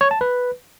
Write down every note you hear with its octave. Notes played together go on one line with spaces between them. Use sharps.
C#5
A5
B4